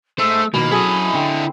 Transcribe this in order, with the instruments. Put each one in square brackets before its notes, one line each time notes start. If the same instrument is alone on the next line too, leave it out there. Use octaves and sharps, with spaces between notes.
[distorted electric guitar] A3 [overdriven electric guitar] G#4 C5 [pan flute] E6
[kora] B2 [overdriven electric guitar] D#3 F3 [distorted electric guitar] A#3 [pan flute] B5
[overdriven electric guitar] F#3 [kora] C#4 G#4 A4 [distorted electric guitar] E4 D#5
[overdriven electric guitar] D3 [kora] C4